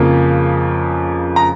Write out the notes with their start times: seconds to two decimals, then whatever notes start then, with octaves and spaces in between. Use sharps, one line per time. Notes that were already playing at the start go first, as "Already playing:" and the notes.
Already playing: F2 C#3 F3 A#3
1.36 A#5